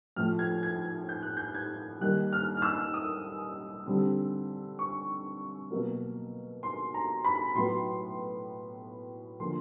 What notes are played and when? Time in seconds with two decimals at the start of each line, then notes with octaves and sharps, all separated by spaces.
0.16 A2 F3 A3 F6
0.39 G#6
0.63 G#6
0.85 G#6
1.09 G6
1.23 F#6
1.37 G6
1.54 G#6
2.01 D#3 G3 A#3 F#6
2.33 F6
2.57 F6
2.62 E6
2.94 D#6
3.86 D3 G3 C4
4.79 C#6
5.71 B2 F#3 A#3
6.63 C6
6.94 A#5
7.25 B5
7.55 A2 F#3 B3 C6
9.40 D3 F3 A#3 C6